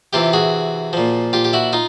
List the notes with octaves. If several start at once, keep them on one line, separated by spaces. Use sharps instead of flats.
C3 E3 F4 G4
F#4 G#4
A#2 F3
F4 G4
G4
E4 F#4
D#4 F4